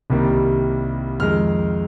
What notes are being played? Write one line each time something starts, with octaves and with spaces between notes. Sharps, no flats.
C2 C3 D#3 G3 A#3
F2 D#3 G#3 F6